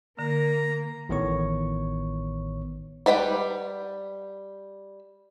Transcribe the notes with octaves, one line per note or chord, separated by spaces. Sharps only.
D3 A#3 A#5
A1 A2 D#3 B3 C#5 C#6
G3 B4 F#5 G5